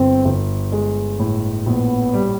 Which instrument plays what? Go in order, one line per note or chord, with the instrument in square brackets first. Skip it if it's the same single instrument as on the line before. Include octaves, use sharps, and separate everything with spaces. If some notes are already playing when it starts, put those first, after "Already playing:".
Already playing: [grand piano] G1 [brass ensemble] C4
[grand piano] G1
G#3
A2
[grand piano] A#1 [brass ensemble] B3
[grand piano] G3